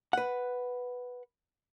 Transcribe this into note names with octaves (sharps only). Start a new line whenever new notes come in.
B4 F#5